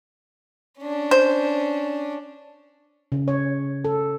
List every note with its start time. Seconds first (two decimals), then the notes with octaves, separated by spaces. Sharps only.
0.80 C#4 D4
1.11 C5
3.12 C#3
3.28 C#5
3.85 A4